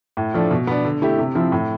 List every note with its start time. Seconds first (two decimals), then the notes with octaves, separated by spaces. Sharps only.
0.17 A2
0.34 F3 A3 D4
0.51 B2
0.67 B3 D4
0.85 D3
1.01 A3 E4 G4
1.19 C3
1.35 F3 C4 E4
1.52 A2